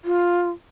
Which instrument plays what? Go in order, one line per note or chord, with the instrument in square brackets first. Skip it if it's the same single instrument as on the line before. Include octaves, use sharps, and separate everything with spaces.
[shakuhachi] F4